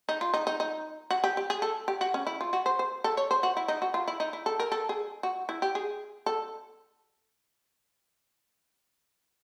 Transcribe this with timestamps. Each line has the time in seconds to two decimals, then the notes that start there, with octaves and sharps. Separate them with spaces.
0.09 D#4
0.21 F4
0.34 D#4
0.47 D#4
0.60 D#4
1.11 F#4
1.24 G4
1.37 G4
1.50 G#4
1.62 A4
1.88 G4
2.01 F#4
2.14 C#4
2.27 E4
2.41 F4
2.53 F#4
2.66 C5
2.79 C5
3.04 A4
3.17 C#5
3.31 C5
3.43 F#4
3.57 E4
3.68 D#4
3.82 F#4
3.94 F4
4.08 E4
4.20 D#4
4.33 E4
4.46 A4
4.59 A#4
4.72 A4
4.89 G#4
5.23 F#4
5.49 E4
5.62 G4
5.75 G#4
6.26 A4